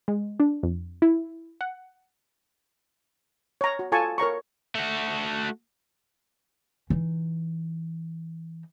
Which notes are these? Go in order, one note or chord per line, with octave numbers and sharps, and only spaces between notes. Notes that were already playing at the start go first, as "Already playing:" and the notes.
G#3
D4
F2
E4
F#5
C#5 A#5
F#4
F4 A4 G#5 A5 C#6
A#4 C#5 A#5 C#6
A3 F#4
E3 D#4